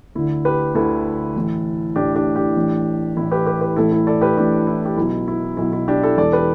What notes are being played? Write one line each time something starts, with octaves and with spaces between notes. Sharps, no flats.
D2 D3 E4
G4 B4
D2 D3 E4 A4
A1 A2 E3
A1 A2 E3 D4 G4
D4 G4
D4 G4
A1 A2 E3
A1 A2 E3 E4
G4 B4
G4 B4
G4 B4
A1 A2 E3 E4 A4
E4 A4
A4 D5
G4 B4
A1 A2 E3 D4 G4
E4
G4
B1 B2 E4
E4
B1 B2 E4
E4
D4 G4
E4 A4
E1 E2 E3 A4 D5
G4 B4